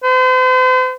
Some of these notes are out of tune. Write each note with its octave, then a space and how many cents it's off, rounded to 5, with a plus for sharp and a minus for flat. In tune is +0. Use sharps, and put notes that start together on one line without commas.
C5 -40